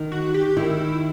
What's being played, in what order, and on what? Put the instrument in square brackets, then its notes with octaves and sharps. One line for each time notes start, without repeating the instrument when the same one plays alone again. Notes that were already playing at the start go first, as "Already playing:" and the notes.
Already playing: [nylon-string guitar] D#3
[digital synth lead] F#4
G4
[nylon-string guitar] D#3 [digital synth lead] E4